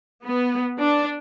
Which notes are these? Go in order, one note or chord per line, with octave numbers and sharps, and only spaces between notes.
B3
D4